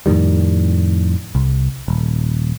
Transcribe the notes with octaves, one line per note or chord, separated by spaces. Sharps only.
F2 A2 D#3 G3
C2
D#1